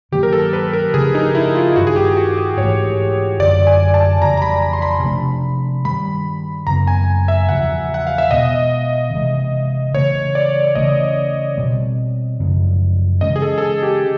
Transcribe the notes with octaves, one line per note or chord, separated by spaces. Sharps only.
G2 D#3 F#3 A#3 G4
A#4
A4
B4
A#4
C#3 F3 A3 D4 G#4
D#4
E4
F4
G2 D#3 G3 F#4
G#4
G4
F#4
G#4
G#2 E3 A3 C#5
F#2 D3 F#3 D5
G#5
A5
F2 C#3 E3 G3 A#5
A#5
B5
C6
B5
C3 F3 A3 D4
G2 D#3 G3 B5
F#2 C#3 F#3 B3 A#5
G#5
E5
E2 C#3 F3 F#5
F#5
F5
E5
B2 G#3 B3 D#5
C3 E3 G#3
C#3 E3 A3 C#5
D5
C#3 E3 A3 C#4 D#5
B2 G3 C4
F#2 C#3 F3 G#3
C#3 E3 G#3 C#4 D#5
G#4
A4
A4
G#4
G4